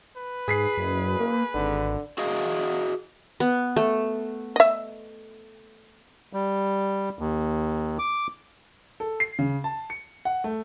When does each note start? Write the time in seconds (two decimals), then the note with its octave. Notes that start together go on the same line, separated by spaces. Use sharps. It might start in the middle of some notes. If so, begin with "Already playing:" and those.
0.17 B4
0.48 G#2 G#4 B6 C7
0.77 F#1 F#2
1.20 A#3
1.54 G#1 D3
2.18 F#4 G#4 D#5 F5
3.40 B3
3.76 A3
4.56 D#5 E5
6.33 G3
7.19 D#2
7.99 D6
9.00 A4
9.20 C7
9.39 C#3
9.64 A5
9.90 C#7
10.25 F#5
10.44 A3